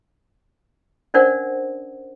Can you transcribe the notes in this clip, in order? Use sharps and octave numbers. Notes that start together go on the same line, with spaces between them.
C#4 D4 A#4 C5 D5 F#5